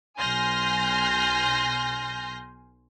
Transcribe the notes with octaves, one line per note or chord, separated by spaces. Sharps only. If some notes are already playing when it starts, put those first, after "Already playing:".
B1 G#5 C6 F6 G6 A#6